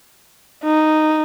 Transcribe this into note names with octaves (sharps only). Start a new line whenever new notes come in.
D#4